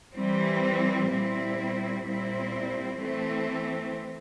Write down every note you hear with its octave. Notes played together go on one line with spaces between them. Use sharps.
E3 G3 C4
A#2 G3 C4 E4
A#2 G3 C4 E4
E3 A3 C4